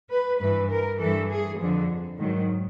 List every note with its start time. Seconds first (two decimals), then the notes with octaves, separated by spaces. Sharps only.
0.10 B4
0.39 G2 E3 B4
0.70 A#4
0.99 G2 E3 A4
1.29 G#4
1.59 F2 D3 F3
2.19 G#2 D#3 F#3